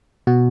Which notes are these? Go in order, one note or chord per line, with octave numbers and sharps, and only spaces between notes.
B2 F#4